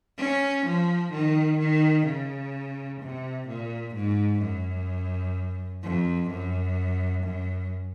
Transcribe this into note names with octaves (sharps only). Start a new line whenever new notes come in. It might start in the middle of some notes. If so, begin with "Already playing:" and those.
C#4
F3
D#3
D#3
C#3
C3
A#2
G#2
F#2
F2
F#2
F#2